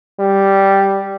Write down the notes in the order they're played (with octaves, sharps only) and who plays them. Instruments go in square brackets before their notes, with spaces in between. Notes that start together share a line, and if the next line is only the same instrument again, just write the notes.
[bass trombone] G3